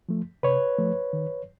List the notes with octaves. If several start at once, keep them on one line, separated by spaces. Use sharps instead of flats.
F3 A3
C3 B4 C#5
F3 A3
D#3